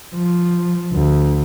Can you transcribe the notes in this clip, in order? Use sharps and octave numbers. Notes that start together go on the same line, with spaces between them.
F3
D2